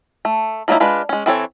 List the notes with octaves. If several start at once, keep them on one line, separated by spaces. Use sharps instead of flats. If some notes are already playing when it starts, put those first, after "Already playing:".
A3
F3 F#3 A#3 D#4 E4
G#3 D4 F4 B4
G#3 C#4
E3 C4 A4 C#5